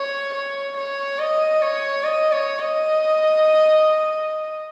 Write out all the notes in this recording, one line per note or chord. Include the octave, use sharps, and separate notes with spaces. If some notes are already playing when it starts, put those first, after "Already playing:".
Already playing: C#5
C#5
C#5
D#5
C#5
D#5
C#5
D#5